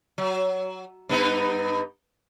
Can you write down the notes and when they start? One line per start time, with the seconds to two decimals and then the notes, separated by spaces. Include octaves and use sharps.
0.18 F#3
1.09 G2 B3 D#4